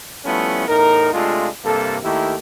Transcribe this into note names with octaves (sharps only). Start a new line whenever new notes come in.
F3 G3 A3 B3 C#4 E4
E2 A2 D#4 A#4
C3 G#3 A3 D4 F4
G2 C3 A#3 A4
D#2 D#3 A3 A#3 E4 G4